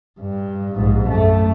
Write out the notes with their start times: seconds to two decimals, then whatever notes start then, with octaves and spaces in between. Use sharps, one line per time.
0.20 G2
0.76 A#1 G#2
1.08 F#2 A3